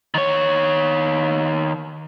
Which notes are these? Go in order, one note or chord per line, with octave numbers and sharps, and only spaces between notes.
D#3 C#5